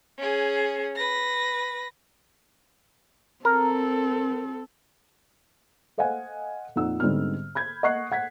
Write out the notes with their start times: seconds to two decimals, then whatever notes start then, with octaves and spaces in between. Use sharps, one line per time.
0.18 C#4 G#4
0.96 B4 A#6
3.45 C4 A4 A#4
5.98 A4 C5 D#5 F5 F#5 G#5
6.76 F2 A#2 A#3 D#4 F#5 E6
7.00 G#2 D3 G3 B3 C4 F6
7.55 B5 G6 G#6
7.83 D#5 F#5 C#6 F#6 C7
8.12 F#5 G#6 B6